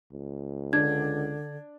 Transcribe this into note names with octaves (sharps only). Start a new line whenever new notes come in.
C#2
D3 D4 G#6